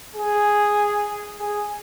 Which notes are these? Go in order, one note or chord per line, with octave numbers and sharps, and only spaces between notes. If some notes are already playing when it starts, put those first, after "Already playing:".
G#4
G#4